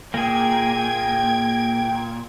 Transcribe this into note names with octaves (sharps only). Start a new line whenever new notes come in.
A#2 A#3 G#4 G5 G#6